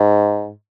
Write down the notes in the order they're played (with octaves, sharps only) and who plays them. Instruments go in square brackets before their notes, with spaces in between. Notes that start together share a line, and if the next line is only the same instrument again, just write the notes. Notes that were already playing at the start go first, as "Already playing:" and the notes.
Already playing: [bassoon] G#2